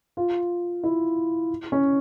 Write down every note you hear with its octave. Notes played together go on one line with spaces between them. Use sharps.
F4
E4
C#4